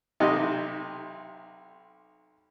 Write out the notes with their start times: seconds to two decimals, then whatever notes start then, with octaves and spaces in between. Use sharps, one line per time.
0.20 B1 C3 G4 D#5